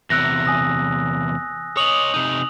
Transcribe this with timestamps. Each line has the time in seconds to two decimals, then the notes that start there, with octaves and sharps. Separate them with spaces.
0.10 E2 C3 E6 F#6 A#6
0.45 G#5 D#6 A#6
1.77 C#5 D#5 D#6 F7 F#7
2.14 C3 D#4